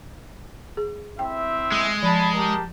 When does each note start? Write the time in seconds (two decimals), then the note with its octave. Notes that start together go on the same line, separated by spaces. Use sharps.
0.77 G#4
1.19 C4 E4 E5 G5
1.72 G#3
2.03 F3 A5 B5
2.35 G4 A#4 A5